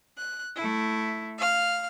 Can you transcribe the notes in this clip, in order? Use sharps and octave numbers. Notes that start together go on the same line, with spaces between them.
F#6
A3 E4
F5 F6